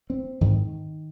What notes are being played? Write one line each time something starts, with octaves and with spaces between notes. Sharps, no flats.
C4
G#2 D#3